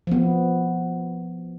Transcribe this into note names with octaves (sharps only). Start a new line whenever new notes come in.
F3 B3